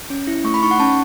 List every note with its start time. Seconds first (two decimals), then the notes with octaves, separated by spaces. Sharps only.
0.10 C#4
0.27 E4
0.44 A3 C#6
0.54 B5
0.63 D#4 C#6
0.71 F#5
0.80 C#4 A5